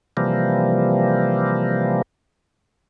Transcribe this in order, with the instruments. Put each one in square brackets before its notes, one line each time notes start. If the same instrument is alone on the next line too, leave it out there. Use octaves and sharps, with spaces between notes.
[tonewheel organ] C3 E3 F3 G3 A#3